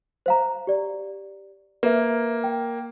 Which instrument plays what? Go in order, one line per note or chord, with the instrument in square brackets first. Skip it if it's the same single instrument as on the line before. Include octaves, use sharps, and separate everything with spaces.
[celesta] C5 F5 A#5
G4 D5
[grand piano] A#3 [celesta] B4 E5
[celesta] G5